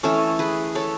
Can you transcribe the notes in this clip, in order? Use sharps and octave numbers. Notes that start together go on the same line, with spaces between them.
E3 A3 C#4 A4 C#5
G#4 B4
A4 C#5